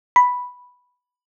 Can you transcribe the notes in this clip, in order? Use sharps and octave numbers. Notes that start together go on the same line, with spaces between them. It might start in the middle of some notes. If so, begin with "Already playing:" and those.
B5